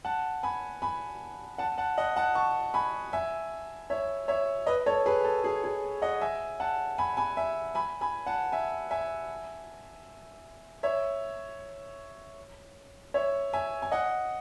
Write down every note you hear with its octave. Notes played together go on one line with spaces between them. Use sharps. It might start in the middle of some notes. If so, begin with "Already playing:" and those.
F#5 A5
G#5 B5
G#5 B5
F#5 A5
F#5 A5
D#5 F#5
F#5 A5
A5 C#6
G#5 B5
E5 G#5
C#5 E5
C#5 E5
B4 D#5
A4 C#5
G#4 B4
A4
G#4
G#4
D#5 F#5
E5 G#5
F#5 A5
G#5 B5
G#5 B5
E5 G#5
G#5 B5
G#5 B5
F#5 A5
E5 G#5
E5 G#5
C#5 E5
C#5 E5
E5 G#5
G#5
D#5 F#5